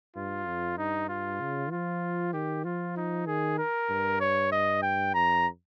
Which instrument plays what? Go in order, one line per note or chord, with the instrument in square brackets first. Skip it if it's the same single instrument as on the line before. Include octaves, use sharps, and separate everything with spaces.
[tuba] G2 [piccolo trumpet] F4
[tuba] F2
[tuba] G2 [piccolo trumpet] D#4
[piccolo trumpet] F4
[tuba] C#3
[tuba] F3 [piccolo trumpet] F4
[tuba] D#3 [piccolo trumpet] G4
[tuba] F3 [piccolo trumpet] F4
[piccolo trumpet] D#4
[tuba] D#3 [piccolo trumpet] G#4
[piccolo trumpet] A#4
[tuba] G2
[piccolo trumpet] C#5
D#5
G5
[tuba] F2 [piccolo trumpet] A#5